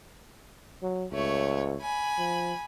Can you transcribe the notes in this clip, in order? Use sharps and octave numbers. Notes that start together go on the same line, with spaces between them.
F#3
C#2 A3 C#5
G#5 B5
F3